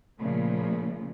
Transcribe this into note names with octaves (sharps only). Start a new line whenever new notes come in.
A#2 C#3 F3 A3